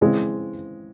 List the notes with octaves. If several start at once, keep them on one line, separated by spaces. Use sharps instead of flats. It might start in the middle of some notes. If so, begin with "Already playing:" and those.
C#3 E3 G#3 C4